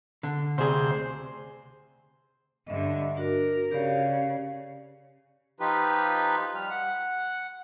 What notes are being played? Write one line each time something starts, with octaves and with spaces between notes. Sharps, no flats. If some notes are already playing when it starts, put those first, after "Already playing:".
D3
D2 C3 G#4 C5
G2 D3 D#5 E5
D4 F#4 A#4
C#3 G4 D5 F5
F3 D#4 F4 G4 B4
G3 F6
F#5